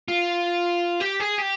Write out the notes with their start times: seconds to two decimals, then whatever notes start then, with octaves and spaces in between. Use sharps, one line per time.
0.08 F4
1.01 G4
1.20 G#4
1.39 G4